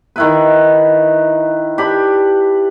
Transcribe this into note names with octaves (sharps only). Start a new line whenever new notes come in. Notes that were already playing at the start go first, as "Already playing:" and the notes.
D#3 E4 B4
D4 G4 B5